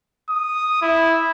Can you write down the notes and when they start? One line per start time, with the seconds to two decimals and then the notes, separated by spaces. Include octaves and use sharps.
0.29 D#6
0.82 E4